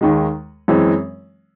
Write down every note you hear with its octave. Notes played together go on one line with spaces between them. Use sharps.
D#2 D#3 G#3
F#2 E3 G#3 C4